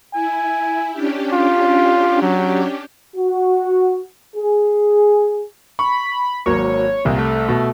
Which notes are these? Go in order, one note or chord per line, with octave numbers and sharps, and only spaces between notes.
E4 G#5
C#4 D4 G4
F4
F#3
F#4
G#4
B5 C#6
G#1 F#3 A#3 C#5
C2 A#2
A3
B2